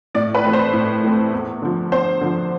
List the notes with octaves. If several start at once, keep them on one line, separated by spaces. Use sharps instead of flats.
A2 D5
B4
E3 A3 C4
C5
A2
E3 A3 C4
E2
D3 F3
E2 C5
D3 F3